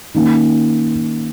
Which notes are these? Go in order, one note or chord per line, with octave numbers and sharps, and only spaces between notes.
D#3 A#3 C#4